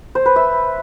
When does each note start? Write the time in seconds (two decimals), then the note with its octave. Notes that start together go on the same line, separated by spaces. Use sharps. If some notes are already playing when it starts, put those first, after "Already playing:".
0.15 C5
0.26 B4
0.36 E5